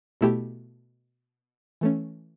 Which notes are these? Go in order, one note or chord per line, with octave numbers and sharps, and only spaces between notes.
B2 A3 E4 G4
E3 A3 C#4